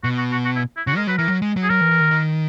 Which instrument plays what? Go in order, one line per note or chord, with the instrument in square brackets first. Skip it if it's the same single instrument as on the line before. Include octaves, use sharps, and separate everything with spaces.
[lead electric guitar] B2 [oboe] F#4
[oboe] F#4
F#4
F#4
E4
E4
[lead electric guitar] C#3 [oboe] F#4
[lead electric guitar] G#3 [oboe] A#4
[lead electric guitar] F#3 [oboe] B4
[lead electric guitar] E3 [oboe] A#4
[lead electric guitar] F#3
G#3
F#3
[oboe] G#4
[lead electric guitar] F#3 [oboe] A#4
[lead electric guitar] E3
E3
D#3
D#3